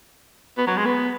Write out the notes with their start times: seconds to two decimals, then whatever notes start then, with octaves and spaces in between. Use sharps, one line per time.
0.58 B3
0.67 F#3
0.77 G#3
0.85 B3